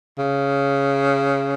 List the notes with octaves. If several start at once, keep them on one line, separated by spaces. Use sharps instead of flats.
C#3